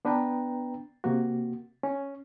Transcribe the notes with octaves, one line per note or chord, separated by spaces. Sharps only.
B3 D4 B4 G5 A#5
C3 A#3 F#4
C#4